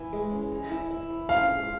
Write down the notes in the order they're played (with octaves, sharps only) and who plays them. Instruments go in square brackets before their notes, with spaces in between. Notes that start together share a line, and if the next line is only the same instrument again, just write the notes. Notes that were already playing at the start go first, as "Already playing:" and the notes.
Already playing: [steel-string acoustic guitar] E3
G#3
C#4
E3
E4
E4
E3
[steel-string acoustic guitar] C#4 [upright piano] F5
[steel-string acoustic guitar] G#3